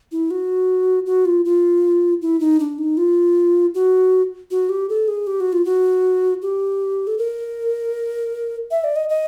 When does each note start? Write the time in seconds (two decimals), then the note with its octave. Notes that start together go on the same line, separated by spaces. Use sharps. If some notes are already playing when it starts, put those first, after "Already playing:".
0.12 E4
0.31 F#4
1.06 F#4
1.25 F4
1.45 F4
2.22 E4
2.40 D#4
2.60 D4
2.78 D#4
2.97 F4
3.74 F#4
4.51 F#4
4.69 G4
4.89 A4
5.08 G#4
5.27 G4
5.40 F#4
5.53 F4
5.65 F#4
6.42 G4
7.07 A4
7.18 A#4
8.71 E5
8.84 D5
8.96 D#5
9.09 D#5